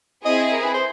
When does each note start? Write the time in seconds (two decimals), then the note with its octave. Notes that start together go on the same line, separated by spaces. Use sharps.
0.24 C4 E4 G#4 D#5
0.52 A#4
0.63 B4
0.74 C5